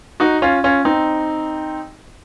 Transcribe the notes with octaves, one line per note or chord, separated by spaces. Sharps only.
D#4 F#4
C#4 F4
C#4 F4
C4 D#4